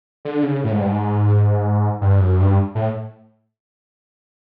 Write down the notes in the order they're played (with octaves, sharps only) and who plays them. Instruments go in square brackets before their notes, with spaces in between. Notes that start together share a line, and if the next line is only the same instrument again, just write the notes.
[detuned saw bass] D3
C#3
A2
G#2
G2
G#2
G2
F#2
G2
A2